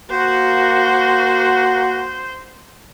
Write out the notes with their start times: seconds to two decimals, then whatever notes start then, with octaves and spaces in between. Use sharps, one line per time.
0.10 A#3 F#4 C5